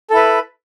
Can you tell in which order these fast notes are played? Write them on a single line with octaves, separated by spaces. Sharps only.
A4 E4 B4